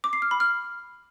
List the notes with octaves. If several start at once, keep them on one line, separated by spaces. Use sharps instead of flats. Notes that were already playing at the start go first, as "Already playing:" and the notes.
D6
C7
F6
B5
F6